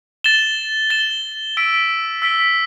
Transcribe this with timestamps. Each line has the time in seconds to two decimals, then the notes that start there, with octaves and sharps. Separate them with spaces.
0.24 A6 E7 G7
0.90 A6 E7 G7
1.57 E6 B6 D7 G7
2.22 E6 B6 D7 G7